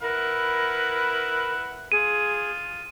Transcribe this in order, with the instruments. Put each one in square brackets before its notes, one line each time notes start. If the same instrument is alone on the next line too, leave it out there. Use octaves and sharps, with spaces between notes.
[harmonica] E4 B4 F#5 [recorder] A#4
[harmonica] F4 [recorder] G#4 [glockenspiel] D#7